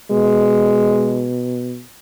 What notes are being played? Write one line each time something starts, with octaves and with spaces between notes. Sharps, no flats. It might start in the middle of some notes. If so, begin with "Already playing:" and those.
B2 G#3